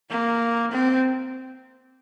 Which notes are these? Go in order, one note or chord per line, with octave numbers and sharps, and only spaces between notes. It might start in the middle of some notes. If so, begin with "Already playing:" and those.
A#3
C4